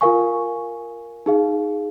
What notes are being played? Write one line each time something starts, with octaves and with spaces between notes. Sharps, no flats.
F4 A#4 F5 G#5 C#6
D#4 G#4 F5